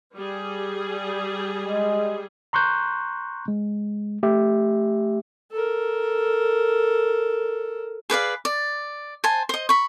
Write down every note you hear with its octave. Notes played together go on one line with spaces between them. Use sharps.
G3 G#4
G#3
A#5 C6 C#6 F#6 G6
G#3
A3 G4 E5
A4 A#4
G#4 B4 D5 F5
D5
C5 G#5 A5
C5 D#5
B5 C#6